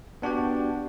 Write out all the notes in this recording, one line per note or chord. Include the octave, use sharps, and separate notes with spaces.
B3 D4 F#4 G4 G5